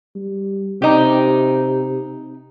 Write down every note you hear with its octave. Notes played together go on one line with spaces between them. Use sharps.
G3
C3 D#4 G4